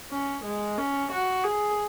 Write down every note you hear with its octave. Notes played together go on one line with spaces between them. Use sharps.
C#4
G#3
C#4
F#4
G#4